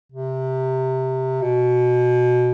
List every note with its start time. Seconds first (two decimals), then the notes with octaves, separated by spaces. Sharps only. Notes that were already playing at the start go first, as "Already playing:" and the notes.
0.12 C3
1.42 B2